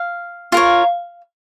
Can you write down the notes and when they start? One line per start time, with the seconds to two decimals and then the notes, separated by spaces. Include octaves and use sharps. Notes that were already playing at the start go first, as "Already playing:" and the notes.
Already playing: F5
0.52 F4 A#4 C#5